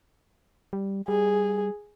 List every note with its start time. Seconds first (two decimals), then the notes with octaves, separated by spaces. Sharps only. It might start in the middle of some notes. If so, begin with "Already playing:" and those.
0.73 G3
1.08 G3 G#4